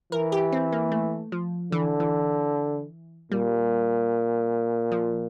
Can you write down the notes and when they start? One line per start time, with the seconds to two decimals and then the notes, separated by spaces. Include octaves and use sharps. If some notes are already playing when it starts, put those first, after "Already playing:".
0.12 E3 A#4
0.32 G4
0.52 C4
0.72 A#3
0.92 A3
1.32 F3
1.72 D3 E3
2.00 E3
3.32 A#2 G3
4.92 F3